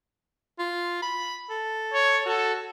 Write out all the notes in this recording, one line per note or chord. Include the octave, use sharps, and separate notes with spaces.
F4
B5
A4
C#5
F#4 A4